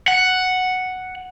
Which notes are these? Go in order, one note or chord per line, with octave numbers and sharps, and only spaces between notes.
F#5